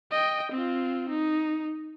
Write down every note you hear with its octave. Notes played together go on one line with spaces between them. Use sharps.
D#5 G5
C4 F4
D#4